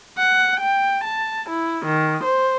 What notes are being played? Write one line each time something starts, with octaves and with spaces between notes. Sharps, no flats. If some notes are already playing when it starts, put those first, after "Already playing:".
F#5
G5
A5
E4
D#3
C5